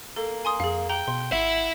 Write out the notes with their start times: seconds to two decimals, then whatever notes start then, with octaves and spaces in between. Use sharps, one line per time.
0.16 A#3 A4
0.45 G#5 C6 D#6
0.60 F2 G#4 F5
0.89 G5 A#5
1.08 B2 C6
1.32 G#1 E4 E5 F#5